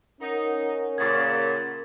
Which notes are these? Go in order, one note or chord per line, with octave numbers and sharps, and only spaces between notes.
C#4 D#4 A#4 F#5
A#2 C#3 G#6 A6